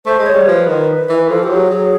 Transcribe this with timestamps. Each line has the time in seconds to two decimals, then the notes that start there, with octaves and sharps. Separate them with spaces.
0.06 A3 C5
0.19 G#3
0.26 C#5
0.34 G3
0.46 F3 B4
0.67 D#3
1.09 E3
1.29 F3 A4
1.43 F3 G4
1.50 F#3
1.56 G#4
1.70 F#3